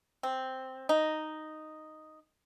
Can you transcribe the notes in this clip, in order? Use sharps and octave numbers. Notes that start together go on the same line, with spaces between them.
C4
D#4